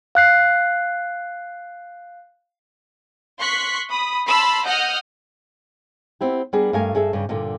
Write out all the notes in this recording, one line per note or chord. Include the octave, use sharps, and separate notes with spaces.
F5 F#6 C7
C6 C#6 F#6 B6
B5 D#6
A5 B5 C6 E6
D#5 F#5 D#6 F6 G6
B3 C4 E4 G4
G3 B3 D4 G#4 A#4
G2 A3 A#4 F5 G#5
G2 G#4 A4 E5
G2 C#3
G2 A#2 D3